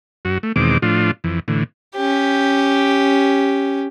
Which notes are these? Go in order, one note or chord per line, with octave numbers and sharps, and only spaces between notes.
F#2 F#4
A3
E2 B2 D#3 G#3 C4 D6
A2 F3 D4 F4
F2 E3
A2 D3 E3
C#4 G4